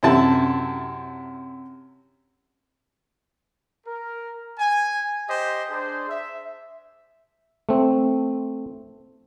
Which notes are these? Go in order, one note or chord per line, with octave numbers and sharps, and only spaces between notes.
F#2 C3 E4 A5
A#4
G#5
G4 C5 D#5
D4 G#4 C5
E5
A3 C4